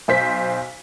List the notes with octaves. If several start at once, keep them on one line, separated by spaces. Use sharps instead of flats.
B1 C5 B6